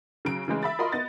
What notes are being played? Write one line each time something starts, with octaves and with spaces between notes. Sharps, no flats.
C#3 F#3 D7
C#3 E3 G#3
E5 B5 A6
F4 A#4 D#5 E5 B5 C6
B3 D#5 A6